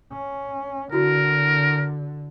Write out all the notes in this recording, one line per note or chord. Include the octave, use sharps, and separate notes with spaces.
C#4
D3 E4 F#4 A#4